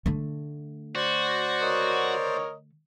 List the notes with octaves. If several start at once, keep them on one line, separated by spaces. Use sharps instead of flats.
D3 A3
F#4 C5 D5
A#4 C#5 D#5